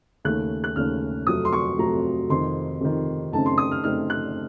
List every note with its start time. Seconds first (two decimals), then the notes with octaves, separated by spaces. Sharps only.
0.25 D#2 C#3 A3 C#4 F#6
0.64 F#6
0.76 D#2 C#3 A3 C#4 F6
1.27 F2 C3 F#3 A3 D#6
1.45 C6
1.53 C#6
1.78 F2 C3 F#3 A3 A#5
2.30 F2 C3 D#3 C6
2.81 F2 C3 D#3
3.33 F#2 C#3 A3 C4 D#4 A5
3.46 C6
3.58 D#6
3.71 F6
3.84 F#2 C#3 A3 C4 D#4 F6
4.10 F#6